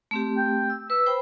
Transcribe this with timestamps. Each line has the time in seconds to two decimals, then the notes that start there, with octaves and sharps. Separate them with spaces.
0.11 A3 C4 G4
0.37 G5
0.70 E6
0.90 B4 E6
1.06 C5 G5 B5